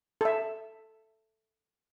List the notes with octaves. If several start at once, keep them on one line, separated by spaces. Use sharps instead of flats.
A4 E5